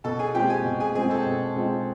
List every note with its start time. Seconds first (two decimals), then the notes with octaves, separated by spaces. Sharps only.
0.04 B2 A4 A5
0.19 G#4 G#5
0.34 G#3 C4 F4 G4 G5
0.49 G#4 G#5
0.65 B2
0.80 G#4 G#5
0.95 G#3 C4 F4 G#4 G#5
1.10 A4 A5
1.26 B2
1.56 G#3 C4 F4